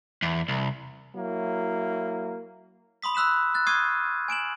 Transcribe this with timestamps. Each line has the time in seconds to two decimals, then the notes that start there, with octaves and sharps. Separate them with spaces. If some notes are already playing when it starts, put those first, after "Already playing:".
0.22 E2
0.48 C2
1.16 F#3 A#3 E4
3.02 B5 C6 D#6 B6
3.15 B5 E6 F#6 B6 E7
3.55 F#6 A6
3.67 C#6 D#6 F6 G#6 C7 D#7
4.28 G#5 D7 E7 F#7